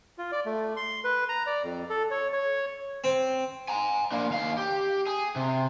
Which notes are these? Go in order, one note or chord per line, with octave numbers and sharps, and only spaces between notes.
F4
D5
A3
C6
B4
A#5
D5
F2
A4
C#5
C#5
C4
G#5 A#5
A#3 D4
D#2 F5
G4
G#4
C3